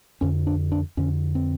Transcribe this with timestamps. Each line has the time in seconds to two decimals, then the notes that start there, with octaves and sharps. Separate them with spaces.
0.21 F2 D3 C#4
0.47 D4
0.72 D4
0.97 F2 D3 C#4
1.35 C4